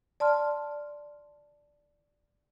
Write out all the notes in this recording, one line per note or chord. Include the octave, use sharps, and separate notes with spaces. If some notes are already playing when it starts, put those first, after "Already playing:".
D5 A5 C6 F6